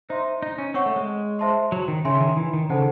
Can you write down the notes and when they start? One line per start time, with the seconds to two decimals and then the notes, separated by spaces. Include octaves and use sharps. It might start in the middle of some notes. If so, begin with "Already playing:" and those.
0.09 D#4 C5 E5 C6
0.42 D#4
0.58 C#4
0.74 C4 C#5 F#5 C#6
0.86 A3
0.96 G#3
1.39 C5 E5 A5 C6
1.72 F#3
1.88 D#3
2.05 C#3 C#5 E5 G#5 C6
2.21 D#3
2.37 E3
2.53 D#3
2.70 C#3 D#4 A4 C5 F#5 A5